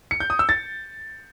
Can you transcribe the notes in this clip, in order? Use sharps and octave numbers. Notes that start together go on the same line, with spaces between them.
C#7
G6
D#6
E6
A6